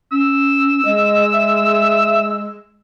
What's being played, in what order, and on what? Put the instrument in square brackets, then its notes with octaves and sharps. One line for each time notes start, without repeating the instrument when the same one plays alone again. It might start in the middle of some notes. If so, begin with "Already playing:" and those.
[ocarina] C#4 [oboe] E6
[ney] G#3 [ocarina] D#5
[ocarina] E5